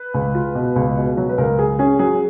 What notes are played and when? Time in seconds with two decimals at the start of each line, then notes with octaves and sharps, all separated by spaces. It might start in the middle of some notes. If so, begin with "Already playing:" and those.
Already playing: B4
0.14 C#2
0.35 F4
0.55 B2
0.76 C#2
0.96 B2
1.17 F#3
1.29 B4
1.38 C#2 A#4
1.58 C#2 G#4
1.79 C#4 G#4
1.99 F#3 G#4